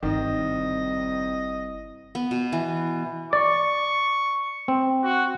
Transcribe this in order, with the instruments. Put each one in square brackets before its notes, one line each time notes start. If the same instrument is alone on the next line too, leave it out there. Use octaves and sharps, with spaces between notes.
[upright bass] G1 [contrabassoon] C2 [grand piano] D#3 [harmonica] D#5
[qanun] B3
B2
E3
[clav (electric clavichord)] D5 [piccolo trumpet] C#6
[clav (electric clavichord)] C4
[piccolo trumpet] F#4